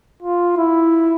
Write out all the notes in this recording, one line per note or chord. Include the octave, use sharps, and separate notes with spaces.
F4
E4